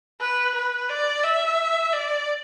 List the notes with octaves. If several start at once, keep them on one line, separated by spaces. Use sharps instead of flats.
B4
B4
D5
E5
D5